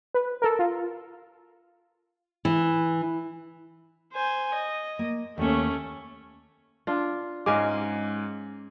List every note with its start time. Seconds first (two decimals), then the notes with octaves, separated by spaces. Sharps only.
0.14 B4
0.42 A4 A#4
0.59 F4
2.45 E3
4.13 C5 G#5
4.54 D#5
4.99 A#3
5.38 D#2 A3 A#3 C#4
6.87 D4 F4
7.46 G#2 G#3 C#4 F5 G#5 D6